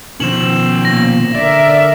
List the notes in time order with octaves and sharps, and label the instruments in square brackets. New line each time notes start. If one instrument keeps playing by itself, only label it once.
[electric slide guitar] B2 D#3 F3 [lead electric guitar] C#4 C5 [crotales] E7 F#7
[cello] A#2 [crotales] A#6
[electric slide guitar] D3 [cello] A#4 E5 [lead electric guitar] D5